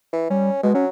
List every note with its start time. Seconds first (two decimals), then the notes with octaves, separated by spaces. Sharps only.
0.13 E3
0.30 G3 C#4
0.63 B2 G#3
0.75 F#3 C#4